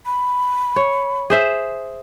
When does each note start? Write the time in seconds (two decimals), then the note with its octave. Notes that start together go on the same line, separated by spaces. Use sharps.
0.06 B5
0.76 C#5
1.30 G#4 C5 E5